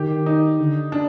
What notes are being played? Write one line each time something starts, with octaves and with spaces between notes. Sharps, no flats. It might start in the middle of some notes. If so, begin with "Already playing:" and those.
Already playing: D#3 G4
D#4
D3
D4